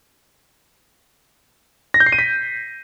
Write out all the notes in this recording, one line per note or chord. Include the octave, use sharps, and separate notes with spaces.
A#6
G6
C7
D#7
B6